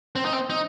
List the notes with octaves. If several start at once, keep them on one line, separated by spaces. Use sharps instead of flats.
C4
D#4
C4
D#4